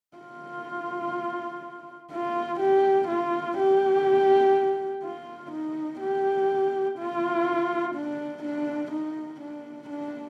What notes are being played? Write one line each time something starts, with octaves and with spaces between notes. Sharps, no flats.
F4
F4
G4
F4
G4
F4
D#4
G4
F4
D4
D4
D#4
D4
D4